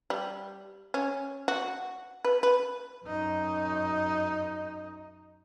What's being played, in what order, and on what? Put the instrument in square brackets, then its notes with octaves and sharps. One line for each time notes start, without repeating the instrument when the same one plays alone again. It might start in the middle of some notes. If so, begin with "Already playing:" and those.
[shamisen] G3
C#4
F#4
B4
B4
[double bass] F#2 D#4